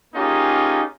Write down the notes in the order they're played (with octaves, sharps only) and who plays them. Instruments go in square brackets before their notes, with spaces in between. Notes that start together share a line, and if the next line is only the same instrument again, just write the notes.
[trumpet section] A#3 C#4 D#4 F4 G4 G#4